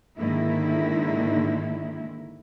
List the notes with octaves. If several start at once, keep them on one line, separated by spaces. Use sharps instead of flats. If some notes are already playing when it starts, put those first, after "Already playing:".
G#2 D3 D#3 A#3 E4